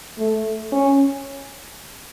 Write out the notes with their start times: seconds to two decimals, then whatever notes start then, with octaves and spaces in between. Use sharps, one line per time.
0.19 A3
0.72 C#4